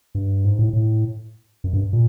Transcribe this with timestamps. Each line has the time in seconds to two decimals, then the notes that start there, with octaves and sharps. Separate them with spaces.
0.15 G2
0.44 G#2
0.59 A2
0.73 A2
1.64 F#2
1.73 G2
1.93 A#2